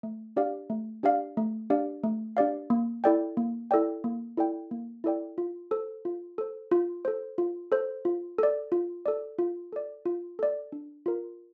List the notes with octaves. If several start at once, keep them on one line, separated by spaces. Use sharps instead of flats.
A3
D4 G4 D5 F5
A3
D4 G4 D5 F5
A3
D4 G4 D5 F5
A3
D4 G4 D5 F5
A#3
E4 A4 D5 G5
A#3
E4 A4 D5 G5
A#3
E4 A4 D5 G5
A#3
E4 A4 D5 G5
F4
A4 C5
F4
A4 C5
F4
A4 C5
F4
A4 C5
F4
A4 D5
F4
A4 D5
F4
A4 D5
F4
A4 D5
D4
F4 A#4